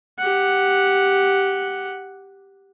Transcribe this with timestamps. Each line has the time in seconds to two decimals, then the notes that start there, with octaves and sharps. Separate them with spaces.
0.18 G4 F#5